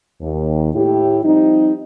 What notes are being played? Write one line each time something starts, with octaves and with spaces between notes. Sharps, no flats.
D#2
A2 E4 G4
F3 G3 C4 D#4